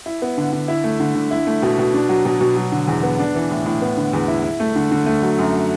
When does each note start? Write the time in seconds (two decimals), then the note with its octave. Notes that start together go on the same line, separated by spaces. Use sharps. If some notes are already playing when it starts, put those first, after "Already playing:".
0.06 E4
0.22 B3
0.37 D3
0.53 D3
0.68 E4
0.84 A3
1.00 D3
1.15 D3
1.31 E4
1.47 A3
1.62 B2
1.78 B2
1.94 D4
2.09 F#3
2.25 B2
2.41 B2
2.56 F#3
2.72 D3
2.87 E2
3.03 B3
3.19 D4
3.35 E3
3.51 A2
3.66 A2
3.82 B3
3.97 D3
4.13 E2
4.28 E4
4.44 E4
4.60 A3
4.76 D3
4.91 D3
5.06 A3
5.22 F#3
5.39 F#2